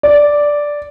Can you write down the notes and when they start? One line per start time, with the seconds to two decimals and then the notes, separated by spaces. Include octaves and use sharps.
0.03 D5